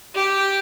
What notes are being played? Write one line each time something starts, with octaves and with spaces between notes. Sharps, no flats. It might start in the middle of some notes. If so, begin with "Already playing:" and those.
G4